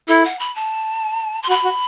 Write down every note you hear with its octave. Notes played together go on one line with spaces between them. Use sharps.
E4 A4
F#5
B5
A5
C6
F#4 B5
F#4